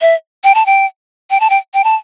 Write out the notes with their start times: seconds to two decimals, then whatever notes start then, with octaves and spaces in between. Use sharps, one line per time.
0.01 E5
0.44 G5
0.55 A5
0.66 G5
1.30 G5
1.40 A5
1.50 G5
1.74 G5
1.84 A5